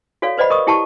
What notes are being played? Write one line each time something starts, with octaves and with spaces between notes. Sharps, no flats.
F#4 A4 C#5 D5 F5
B4 C5 D5 D#5 F#5 B5
A#4 D#5 C#6 D#6
E4 G4 F#5 A5 B5 C#6